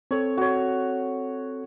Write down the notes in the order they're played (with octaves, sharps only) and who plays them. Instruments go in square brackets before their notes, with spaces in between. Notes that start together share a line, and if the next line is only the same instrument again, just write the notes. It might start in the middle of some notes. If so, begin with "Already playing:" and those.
[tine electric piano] C4 A4 [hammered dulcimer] C#5
[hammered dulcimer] F#4 C#5